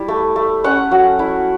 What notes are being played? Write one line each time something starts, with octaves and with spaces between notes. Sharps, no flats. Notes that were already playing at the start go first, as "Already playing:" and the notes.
Already playing: G3 E4
A3
A3
C#4 F#5
F#3
E4